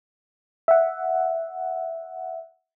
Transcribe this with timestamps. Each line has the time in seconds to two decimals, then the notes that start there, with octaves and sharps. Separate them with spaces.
0.68 E5 F#5